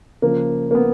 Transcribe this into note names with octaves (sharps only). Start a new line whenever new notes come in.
C#3 F3 A#3
A#3
B3